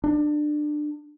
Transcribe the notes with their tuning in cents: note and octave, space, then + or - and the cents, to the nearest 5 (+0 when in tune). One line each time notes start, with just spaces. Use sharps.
D4 +25